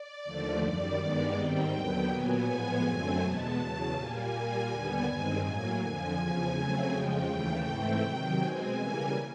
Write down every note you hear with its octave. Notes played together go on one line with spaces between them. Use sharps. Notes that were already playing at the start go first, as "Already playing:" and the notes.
Already playing: D5
D#2 D3 F3 A3
F#2 D#3 G3 D5
G2 D#3 G#3 B3
G#2 D#3 G3 C4 G5
D#2 D3 F#3 B3
A#2 F#3 B3 G#5
A2 F3 G#3 B3
F#2 D3 F#3 A3 C4
E2 B2 G#3 B3 A5
E2 C#3 F#3
A#2 G3 A#3 G#5
A#2 G3 A#3
D#2 D3 G3 B3
G2 D#3 G#3 C4
A2 F#3 A#3 G#5
F2 D3 F3 G#5
E2 C#3 F3
C#3 F#3 A3 C4
F2 C#3 F3 G#3 G5
D#2 C#3 E3 A3
G#2 E3 A3 C4
C3 D#3 F#3
B2 G#3 C4 G#5
C#3 E3 G3 A#3